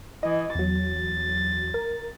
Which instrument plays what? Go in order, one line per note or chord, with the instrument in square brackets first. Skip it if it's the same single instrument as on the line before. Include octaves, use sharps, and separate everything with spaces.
[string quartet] E3 [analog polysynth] D#5
[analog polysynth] E2 F#3 [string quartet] A6
[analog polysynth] A#4